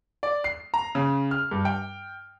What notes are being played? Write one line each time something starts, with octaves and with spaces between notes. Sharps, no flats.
D5
C7
A#5
C#3
F6
G2
G5